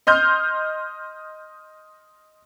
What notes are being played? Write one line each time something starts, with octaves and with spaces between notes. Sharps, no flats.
D#5 C6 F6 G6